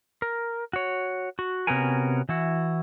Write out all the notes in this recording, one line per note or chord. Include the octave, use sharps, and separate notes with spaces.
A#4
F#4 C#5
F#4
C3 B3 C#4 F#4 A#4 G#5
E3 E4 F#4